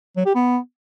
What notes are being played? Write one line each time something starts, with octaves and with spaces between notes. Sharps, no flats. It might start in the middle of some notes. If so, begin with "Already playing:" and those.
F#3
G4
B3